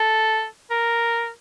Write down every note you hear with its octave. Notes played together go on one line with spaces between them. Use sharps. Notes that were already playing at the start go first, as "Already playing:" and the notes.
Already playing: A4
A#4